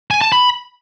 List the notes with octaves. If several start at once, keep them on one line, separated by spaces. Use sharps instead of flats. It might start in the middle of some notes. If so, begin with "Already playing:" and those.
G#5
A5
B5